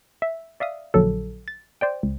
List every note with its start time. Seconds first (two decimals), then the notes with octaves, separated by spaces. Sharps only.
0.22 E5
0.60 D5 E5 F5 D#6
0.94 A#1 D3 F#3 A4
1.48 A6
1.81 C5 D5 G5
2.03 C#2